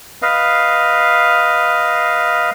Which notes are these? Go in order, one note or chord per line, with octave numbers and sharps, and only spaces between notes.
B4 D#5 F5